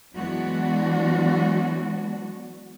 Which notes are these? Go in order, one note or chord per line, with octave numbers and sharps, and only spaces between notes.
E3 F#3 G#3 B3 D4 F#4